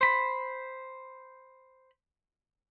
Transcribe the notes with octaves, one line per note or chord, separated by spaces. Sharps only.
C5 B5